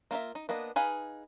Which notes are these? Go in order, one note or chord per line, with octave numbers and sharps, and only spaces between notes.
A#3 F4 A#4 E5
D#4
A#3 B3 D4 D#5
D#4 G#4 B4 F5